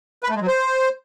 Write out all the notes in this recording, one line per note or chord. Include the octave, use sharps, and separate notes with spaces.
B4
A3
G#3
F#3
C5